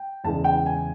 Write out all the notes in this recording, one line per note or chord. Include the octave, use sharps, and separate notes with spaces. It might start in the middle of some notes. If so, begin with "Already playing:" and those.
Already playing: G5
E2 C#3 E3 G#3 A5
G5
G#5